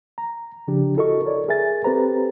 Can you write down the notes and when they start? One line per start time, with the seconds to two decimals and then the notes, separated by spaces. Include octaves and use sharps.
0.18 A#5
0.68 C#3 F3 D4 G4
0.96 E4 F#4 A4 A#4 D#5 C#6
1.25 A4 A#4 C#5 D5
1.48 G#4 A#4 E5 G#5 A6
1.84 C4 G4 A4 B4 C5 A#5